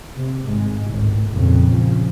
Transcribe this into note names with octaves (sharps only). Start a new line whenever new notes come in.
C3
G#1 G#2 G#3
G#1 C#2 A2
A#1 F2 C#3
C#3 F3